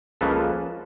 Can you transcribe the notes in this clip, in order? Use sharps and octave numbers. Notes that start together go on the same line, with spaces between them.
C#2 C#3 F3 A#3 A4 B4